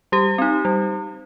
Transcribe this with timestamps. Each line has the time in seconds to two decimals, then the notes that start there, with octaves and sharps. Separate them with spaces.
0.12 G3 G4
0.38 C4 D#4
0.65 G3